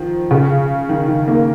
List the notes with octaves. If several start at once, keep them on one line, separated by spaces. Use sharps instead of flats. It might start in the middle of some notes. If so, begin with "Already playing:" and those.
Already playing: D#3 F3
C#3
D#3
D#3
A#3